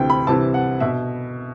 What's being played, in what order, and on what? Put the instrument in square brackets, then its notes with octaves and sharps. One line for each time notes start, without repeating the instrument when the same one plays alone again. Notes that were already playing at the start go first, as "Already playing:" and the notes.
Already playing: [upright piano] D2 C3 E3 G5
B5
C2 C3 E3 A5
F#5
B2 E5